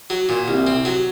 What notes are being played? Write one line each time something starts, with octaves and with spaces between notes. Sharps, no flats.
F#3
A#2
C2
C4
F#3